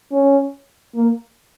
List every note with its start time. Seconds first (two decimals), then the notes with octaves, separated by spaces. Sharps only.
0.12 C#4
0.95 A#3